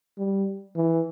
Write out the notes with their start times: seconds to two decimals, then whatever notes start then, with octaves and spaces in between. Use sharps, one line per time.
0.18 G3
0.75 E3